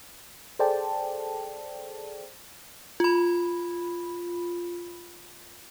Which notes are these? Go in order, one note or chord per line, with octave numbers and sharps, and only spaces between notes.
G#4 A4 C5 D5 G5 A5
F4 B5